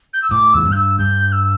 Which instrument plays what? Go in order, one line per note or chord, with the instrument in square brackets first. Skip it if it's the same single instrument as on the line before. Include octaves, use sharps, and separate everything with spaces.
[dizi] G6
E6
[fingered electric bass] A2 [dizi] D6
[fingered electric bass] E2 [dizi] E6
[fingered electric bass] G2
[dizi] G6
E6
[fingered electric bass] G2 [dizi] G6
[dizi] E6